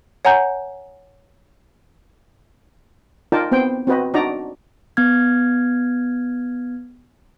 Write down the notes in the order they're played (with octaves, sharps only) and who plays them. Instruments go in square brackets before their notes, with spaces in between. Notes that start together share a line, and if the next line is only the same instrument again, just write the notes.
[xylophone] C#5 F#5 G#5 A#5 G6
[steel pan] D#4 F4 A#4 D5 G5 A5
B3 C4 C5 G5
C4 F#4 B4 D#5
D4 D#4 F#4 D5 A#5
[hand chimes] B3 F6 G#6